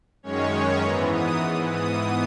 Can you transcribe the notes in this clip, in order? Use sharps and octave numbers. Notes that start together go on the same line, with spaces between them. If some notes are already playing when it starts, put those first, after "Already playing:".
F#2 D#3 G#3 C#4 C#5
G#2 E3 B3 A#5
D#6
G#2 E3 B3
D#6